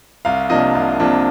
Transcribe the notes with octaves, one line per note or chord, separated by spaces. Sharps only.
C2 F5
C3 F3 A#3 D4 D#5
C2
C3 F3 A#3 D4